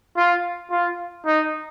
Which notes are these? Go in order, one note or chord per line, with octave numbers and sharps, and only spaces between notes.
F4
F4
D#4